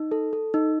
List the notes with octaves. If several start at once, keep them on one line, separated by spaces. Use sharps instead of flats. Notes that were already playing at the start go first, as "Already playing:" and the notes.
Already playing: D#4
A4
A4
D#4